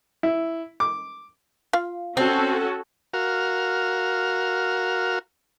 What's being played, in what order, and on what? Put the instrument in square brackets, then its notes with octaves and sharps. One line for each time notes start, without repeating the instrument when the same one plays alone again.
[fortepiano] E4
D6
[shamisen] F4 F5
[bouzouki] C4 [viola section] C#4 F#4 A4
[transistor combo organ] F#4 A#4 F5